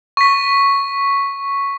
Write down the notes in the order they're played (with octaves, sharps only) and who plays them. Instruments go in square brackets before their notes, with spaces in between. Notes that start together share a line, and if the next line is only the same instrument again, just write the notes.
[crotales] C#6 B6